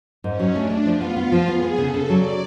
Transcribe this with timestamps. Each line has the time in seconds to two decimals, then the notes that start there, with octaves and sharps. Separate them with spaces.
0.24 G#2 C#4
0.40 F#3
0.55 A3 D4
0.71 A3
0.85 F3 F4
1.01 B3
1.17 B3 F4
1.32 F3
1.48 B3 G#4
1.62 B3
1.78 C#3 A4
1.94 C#3
2.09 F#3 D5